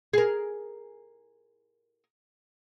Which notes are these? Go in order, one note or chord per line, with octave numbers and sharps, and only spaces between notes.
G#4 A#4